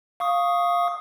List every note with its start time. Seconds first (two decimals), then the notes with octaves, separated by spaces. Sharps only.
0.20 F5 C#6 D#6